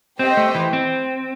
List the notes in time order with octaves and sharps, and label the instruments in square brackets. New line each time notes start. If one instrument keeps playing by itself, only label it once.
[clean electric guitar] C4 [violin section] G4 C5 D#5 G5
[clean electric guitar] A3
E3
C4